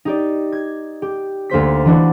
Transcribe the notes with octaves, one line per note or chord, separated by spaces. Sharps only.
D#4 G4 D5
G#6
G4
D2 A#3 C5 B6
E3 D4 F#4